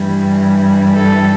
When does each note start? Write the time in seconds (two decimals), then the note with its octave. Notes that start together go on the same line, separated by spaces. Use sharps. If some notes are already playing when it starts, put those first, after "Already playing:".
Already playing: G2 E3 G3
0.94 A4